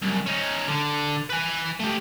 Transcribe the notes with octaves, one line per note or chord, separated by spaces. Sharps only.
C2 F#2
C#4 D#4
D3
B4 G#5
A3 G4